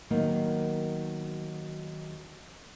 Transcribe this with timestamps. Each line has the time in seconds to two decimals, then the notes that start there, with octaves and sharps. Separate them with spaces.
0.10 D#3 F#3 A#3 B3